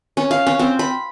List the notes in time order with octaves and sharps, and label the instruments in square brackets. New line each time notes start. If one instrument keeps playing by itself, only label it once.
[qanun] C#4
F5
C#4
C4
B5